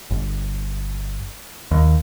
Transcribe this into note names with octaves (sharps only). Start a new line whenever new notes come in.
G1
D#2